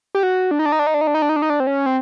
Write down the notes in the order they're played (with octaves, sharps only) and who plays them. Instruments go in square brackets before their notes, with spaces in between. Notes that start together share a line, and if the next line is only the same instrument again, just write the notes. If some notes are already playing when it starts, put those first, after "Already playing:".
[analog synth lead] G4
F#4
D4
D#4
D4
D#4
D4
D#4
D4
D#4
D4
D#4
D4
D#4
D4
D#4
D4
C4
C#4
C4